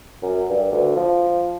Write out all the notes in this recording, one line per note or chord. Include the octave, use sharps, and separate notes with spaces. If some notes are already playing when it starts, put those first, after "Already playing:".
F#2
G2
D2
F3